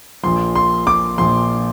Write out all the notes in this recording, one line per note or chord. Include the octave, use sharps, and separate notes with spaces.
A#1 A#2 F3 C6
C6
D6
A#1 A#2 F3 C6